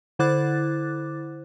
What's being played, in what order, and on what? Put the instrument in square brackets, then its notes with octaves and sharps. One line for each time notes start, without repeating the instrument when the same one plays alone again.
[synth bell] D3 E4 C5 D6 F#6 A6